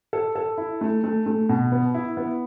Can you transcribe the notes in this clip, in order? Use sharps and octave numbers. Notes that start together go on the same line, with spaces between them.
A4
A4
E4
A3
A3
A3
B2
B3
E4
B3